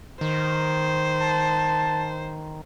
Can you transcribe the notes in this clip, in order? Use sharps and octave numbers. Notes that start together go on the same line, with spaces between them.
D#3 C5
A5